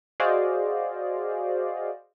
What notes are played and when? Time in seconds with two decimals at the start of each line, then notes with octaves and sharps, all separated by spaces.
0.20 F#4 G#4 C5 D5 D#5 F5